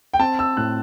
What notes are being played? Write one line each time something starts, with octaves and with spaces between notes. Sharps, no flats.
G5
C4 A5
E6
A2 F#6